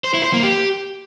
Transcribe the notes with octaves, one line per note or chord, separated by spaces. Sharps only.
C5
E4
C5
A#3
G4